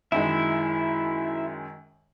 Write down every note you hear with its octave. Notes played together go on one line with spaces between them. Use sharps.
F#2 D#3 G#3 E4 E5